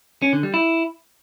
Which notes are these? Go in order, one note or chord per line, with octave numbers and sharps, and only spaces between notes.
C#4
D3
G3
E4